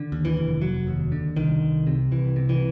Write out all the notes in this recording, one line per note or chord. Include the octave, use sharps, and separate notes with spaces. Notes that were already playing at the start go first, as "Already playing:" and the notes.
Already playing: D3
D#2
E3
F1
F1 F#3
D#2
D3
C2 D#3
C2
C3
C2 E3
C3
E3